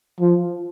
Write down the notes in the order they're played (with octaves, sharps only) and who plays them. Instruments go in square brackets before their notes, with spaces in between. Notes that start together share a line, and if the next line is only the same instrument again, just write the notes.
[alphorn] F3